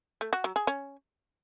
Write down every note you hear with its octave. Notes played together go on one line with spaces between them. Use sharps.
A3
F#4
F#3
G#4
C#4